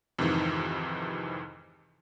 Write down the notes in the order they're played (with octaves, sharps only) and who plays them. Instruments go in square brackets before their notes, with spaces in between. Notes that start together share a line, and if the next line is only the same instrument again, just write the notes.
[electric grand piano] F2 G#2 C3 D#3 E3